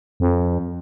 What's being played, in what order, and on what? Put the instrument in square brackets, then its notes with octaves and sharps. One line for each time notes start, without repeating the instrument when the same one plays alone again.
[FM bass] F2